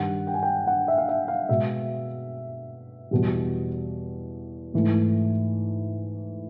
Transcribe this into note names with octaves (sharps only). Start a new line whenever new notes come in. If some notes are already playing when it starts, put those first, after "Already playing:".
Already playing: G2 D#3 G3 F#5
G5
G#5
G5
F#5
E5
F5
E5
F5
B2 G#3 E5
E2 B2 G3
G#2 E3 A3